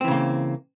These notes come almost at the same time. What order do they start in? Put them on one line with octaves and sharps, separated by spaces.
C4 E3 C#3 A#3